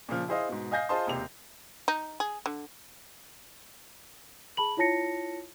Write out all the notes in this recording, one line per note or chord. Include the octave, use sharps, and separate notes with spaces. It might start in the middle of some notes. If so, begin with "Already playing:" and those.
A#2 C#3 F3 F6
E4 G#4 C5 D#5 F5
G#2 B2
D#5 F5 G#5 G6 A#6 C7
F4 G#4 C5 D#5 A5 C6
E1 D#2 C3 F7
D#4
G#4
D3
G#4 A5 B5 F#7
E4 F4 C#5 A5 A#6 C#7